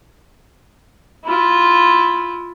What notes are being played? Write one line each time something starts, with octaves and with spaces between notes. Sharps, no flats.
E4 F4